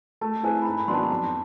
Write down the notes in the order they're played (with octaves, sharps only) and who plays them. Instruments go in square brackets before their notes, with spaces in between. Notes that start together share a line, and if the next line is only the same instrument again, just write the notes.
[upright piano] A3 [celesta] A5
[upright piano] C4 E4 G#4 B4 [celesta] G#5
[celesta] B5
[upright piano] G#2 [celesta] A#5
[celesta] B5
[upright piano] D#3 F#3 B3 D4 [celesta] C6
[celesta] A5
A#5
[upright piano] F2 [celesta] A5